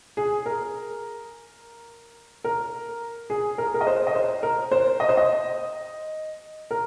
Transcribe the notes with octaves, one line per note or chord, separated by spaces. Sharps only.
G#4
A#4
A#4
G#4
A#4
G#4
A#4
D#5
C5
D#5
C5
A#4
C5
D#5
C5
D#5
A#4